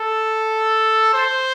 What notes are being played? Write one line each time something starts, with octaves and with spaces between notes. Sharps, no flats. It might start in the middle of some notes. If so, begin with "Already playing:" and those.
Already playing: A4
C5